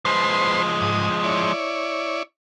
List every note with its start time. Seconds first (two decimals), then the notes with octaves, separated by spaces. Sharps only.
0.05 F3 G#3 B4 C5 C6
0.81 G#2 D#6
1.24 E4 C#5 D5